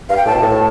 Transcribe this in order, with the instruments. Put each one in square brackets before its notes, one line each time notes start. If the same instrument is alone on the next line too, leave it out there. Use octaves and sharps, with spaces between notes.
[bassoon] G2 [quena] F5
[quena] G5
[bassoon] A2 [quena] A5
[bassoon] B2
A2